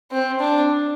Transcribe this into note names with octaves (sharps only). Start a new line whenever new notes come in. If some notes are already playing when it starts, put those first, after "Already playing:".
C4
D4